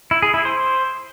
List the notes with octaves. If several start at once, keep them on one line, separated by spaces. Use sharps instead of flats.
E4
G#4
E4
C5